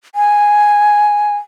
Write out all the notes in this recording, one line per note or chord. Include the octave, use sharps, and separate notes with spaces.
G#5